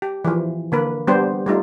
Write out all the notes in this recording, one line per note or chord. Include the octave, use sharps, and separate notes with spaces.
G4
E3 F3
D3 A#3 B4
G3 B3 D4 G4 C5
G3 A3 D#4 F4